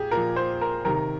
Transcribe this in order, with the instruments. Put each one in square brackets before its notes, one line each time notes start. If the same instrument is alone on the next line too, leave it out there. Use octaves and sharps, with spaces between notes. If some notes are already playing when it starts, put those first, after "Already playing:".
Already playing: [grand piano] A#2 G4 G#4
A#2 F3 A#4
C5
A#4
C3 D#3 A#4